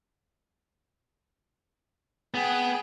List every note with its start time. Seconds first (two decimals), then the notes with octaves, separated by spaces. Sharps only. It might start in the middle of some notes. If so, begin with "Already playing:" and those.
2.34 B3 G#4 G5